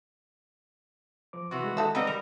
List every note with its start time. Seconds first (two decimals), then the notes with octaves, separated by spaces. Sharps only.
1.33 F3 C5 D6
1.51 C3 E3 F#4 C#6
1.64 D#3 G#3
1.77 D#4 A4 E5
1.95 C#3 G3 B3 C4 D#4 D#5
2.07 G3 A#4